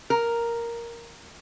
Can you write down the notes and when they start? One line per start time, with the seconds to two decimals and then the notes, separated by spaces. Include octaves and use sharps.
0.10 A#4